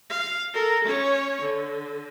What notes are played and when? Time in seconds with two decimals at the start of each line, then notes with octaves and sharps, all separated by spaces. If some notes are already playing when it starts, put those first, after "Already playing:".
0.10 F5
0.54 A4 A#4
0.84 C#4 C#5
1.41 D3